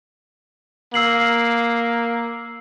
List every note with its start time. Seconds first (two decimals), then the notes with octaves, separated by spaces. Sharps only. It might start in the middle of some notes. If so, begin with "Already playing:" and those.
0.94 A#3 E6 C7 F#7